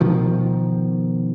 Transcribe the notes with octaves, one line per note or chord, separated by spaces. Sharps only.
B2 D#3 F3